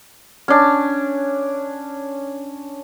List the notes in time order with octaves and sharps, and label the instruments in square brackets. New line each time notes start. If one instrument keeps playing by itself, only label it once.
[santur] C#4 D4